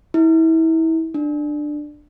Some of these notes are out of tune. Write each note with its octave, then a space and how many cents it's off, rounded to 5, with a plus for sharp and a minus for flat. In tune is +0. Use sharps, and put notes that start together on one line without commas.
E4 -30
D4 +15